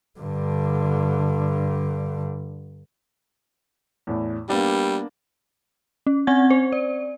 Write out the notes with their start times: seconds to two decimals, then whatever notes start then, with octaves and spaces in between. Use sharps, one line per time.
0.20 G2 D3
4.07 E2 A2
4.49 G3 A#3 B3 D4
6.07 C#4
6.27 C4 F#5 G#5 G#6
6.50 C5
6.72 D5